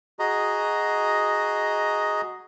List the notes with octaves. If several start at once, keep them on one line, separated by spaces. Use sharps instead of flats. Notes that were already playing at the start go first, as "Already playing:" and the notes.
F#4 G#4 D#5 A#5